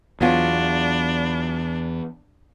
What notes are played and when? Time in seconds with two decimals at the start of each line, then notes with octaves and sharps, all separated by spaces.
0.21 E2 F#3 B3 D4 F4